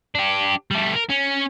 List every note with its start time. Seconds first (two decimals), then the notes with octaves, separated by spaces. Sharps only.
0.15 D4 G4
0.71 G3 A3
0.94 A#4
1.10 C#4